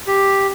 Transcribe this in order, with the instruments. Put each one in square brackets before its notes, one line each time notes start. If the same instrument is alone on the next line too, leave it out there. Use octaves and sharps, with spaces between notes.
[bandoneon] G4